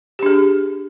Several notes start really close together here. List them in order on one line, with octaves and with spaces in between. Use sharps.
G4 D4 G#4